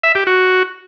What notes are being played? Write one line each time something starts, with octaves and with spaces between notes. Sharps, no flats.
E5
G4
F#4